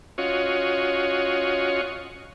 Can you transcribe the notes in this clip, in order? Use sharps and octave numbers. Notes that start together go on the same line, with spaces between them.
C#4 F4 F#4 C#5 D#5